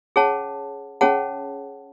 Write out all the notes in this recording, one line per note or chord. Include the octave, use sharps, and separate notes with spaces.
C#4 G#4 C#5 F#5 A5
C#4 G#4 C#5 F#5 A5